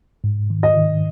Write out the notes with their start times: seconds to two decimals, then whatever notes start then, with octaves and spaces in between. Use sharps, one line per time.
0.24 G#2
0.50 D#3
0.63 D#5
0.77 D#3